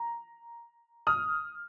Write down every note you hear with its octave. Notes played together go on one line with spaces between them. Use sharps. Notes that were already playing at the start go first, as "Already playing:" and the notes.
Already playing: A#5
D#6 F6